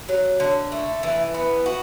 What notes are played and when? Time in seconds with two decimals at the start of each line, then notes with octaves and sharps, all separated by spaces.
0.09 F#3
0.40 D3
0.72 A3
1.03 E3
1.34 B3
1.66 F#4